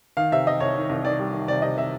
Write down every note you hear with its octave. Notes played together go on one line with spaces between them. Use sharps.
D#3 F5
C3 E5
C3 D#5
C2 C#5
D#3
C2
D#3 D5
G3
D#3
C3 D5
C3 D#5
C3 E5